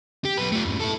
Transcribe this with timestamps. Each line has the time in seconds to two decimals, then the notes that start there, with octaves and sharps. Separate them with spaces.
0.25 G4
0.37 B1 B4
0.52 A3 F4
0.65 F2 G#2
0.79 E4 A4